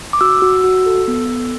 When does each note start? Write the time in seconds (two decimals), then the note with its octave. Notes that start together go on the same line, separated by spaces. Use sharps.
0.13 D6
0.21 F#4 E6
0.42 F#4
0.64 F#4
0.86 A4
1.08 B3
1.29 A4